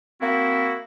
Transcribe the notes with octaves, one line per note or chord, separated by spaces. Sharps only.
A#3 C4 E4 F#4